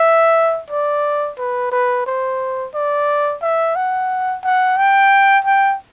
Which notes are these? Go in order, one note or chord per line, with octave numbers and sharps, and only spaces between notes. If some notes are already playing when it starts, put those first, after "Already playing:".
Already playing: E5
D5
B4
B4
C5
D5
E5
F#5
F#5
G5
G5